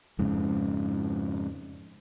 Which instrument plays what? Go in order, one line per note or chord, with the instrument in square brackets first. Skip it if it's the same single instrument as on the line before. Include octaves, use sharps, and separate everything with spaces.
[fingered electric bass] F2 G#2 C#3